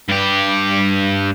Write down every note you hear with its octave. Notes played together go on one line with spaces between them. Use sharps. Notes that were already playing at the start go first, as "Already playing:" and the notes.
G2 G4